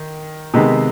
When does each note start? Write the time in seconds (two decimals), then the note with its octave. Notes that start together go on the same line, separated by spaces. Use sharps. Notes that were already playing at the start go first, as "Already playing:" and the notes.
Already playing: D#3
0.54 C3 D#3 G#3 B3 D#4